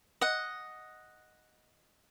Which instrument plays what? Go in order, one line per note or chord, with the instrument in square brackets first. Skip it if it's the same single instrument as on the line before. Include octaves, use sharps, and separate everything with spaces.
[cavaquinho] D#5 F#5